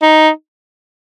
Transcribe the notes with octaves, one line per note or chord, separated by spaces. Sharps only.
D#4